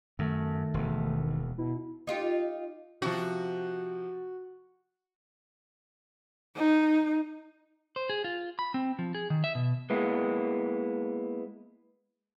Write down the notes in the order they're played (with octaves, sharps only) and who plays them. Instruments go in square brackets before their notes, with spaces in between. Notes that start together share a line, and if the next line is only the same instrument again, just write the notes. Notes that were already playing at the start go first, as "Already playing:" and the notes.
[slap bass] F#2 [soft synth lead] D#3 [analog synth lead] A3
[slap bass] E1 D#2
[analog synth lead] B2 [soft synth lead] E4
[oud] D#4 F4 G4
[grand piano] C3 F3 [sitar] F#4
[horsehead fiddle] D#4
[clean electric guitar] C5
G#4
F4
B5
C4
F3
G#4
D#3
E5
B2
G#3 A#3 B3 E4